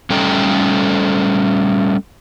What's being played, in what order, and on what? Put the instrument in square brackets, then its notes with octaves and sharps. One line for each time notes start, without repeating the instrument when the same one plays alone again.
[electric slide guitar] G3 A3 C#4 A4 G5 A#5